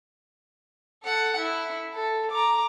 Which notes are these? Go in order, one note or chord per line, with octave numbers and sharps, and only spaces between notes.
A4 F#5
E4
A4
A#5 D6